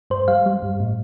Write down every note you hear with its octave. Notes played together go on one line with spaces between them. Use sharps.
G2 C5
G3 F5
G3
G2
A2